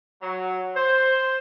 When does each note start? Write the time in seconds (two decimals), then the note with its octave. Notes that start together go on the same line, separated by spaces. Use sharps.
0.22 F#3
0.76 C5